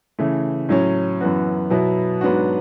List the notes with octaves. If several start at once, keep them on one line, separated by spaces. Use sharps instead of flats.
C#3 E3 A3
A2 F#3 C#4
F#2 E3 B3 F#4
B2 F#3 B3 E4
G#2 F#3 B3 D4 F#4